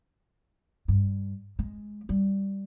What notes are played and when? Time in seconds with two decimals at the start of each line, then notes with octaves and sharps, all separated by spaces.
0.88 G2
1.59 G#3
2.09 G3